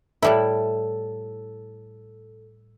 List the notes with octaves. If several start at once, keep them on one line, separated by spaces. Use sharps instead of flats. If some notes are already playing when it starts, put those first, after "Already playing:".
A2 G3 E4 A4